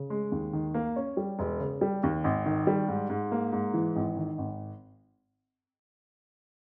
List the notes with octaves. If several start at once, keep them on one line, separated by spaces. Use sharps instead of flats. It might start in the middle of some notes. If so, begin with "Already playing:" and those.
Already playing: C#3
G#3
D#2
D#3
A#3
C#4
G3
E1
C#3
G3
D#2
G#1
D#3
G3
G#2
G#2
A#3
G#2
E3
G#1
D#3
G#1